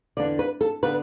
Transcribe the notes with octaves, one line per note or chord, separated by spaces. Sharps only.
E2 D3 B3 D4 D5
B4
A4
D3 B3 D4 B4